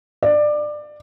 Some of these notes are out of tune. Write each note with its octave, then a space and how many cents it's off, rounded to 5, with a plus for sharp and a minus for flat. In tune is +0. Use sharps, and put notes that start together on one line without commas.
D5 +20